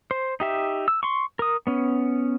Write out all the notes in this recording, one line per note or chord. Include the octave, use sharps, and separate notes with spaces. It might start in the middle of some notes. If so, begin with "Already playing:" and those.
C5
D#4 G4 E5
E6
C6 C#6
A#4 D#6
B3 C#4